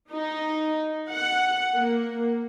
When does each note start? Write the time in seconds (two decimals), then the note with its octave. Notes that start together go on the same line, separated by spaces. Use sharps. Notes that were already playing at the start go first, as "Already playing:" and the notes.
0.12 D#4
1.10 F#5
1.74 A#3